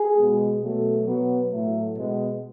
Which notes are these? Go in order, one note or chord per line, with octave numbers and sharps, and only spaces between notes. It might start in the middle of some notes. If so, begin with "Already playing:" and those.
Already playing: G#4
B2 G#3 B3
B2 F#3 A3
B2 F#3 B3
A2 F#3 A3
B2 G#3 B3